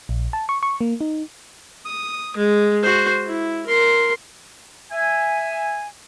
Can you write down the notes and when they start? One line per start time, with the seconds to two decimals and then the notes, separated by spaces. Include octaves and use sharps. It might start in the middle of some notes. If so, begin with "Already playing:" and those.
0.09 A#1
0.33 A5
0.49 C#6
0.63 C#6
0.81 A#3
1.01 D#4
1.86 D#6
2.37 G#3
2.83 F#4 C5
3.25 E4
3.67 A#4 C6
4.92 E5 G#5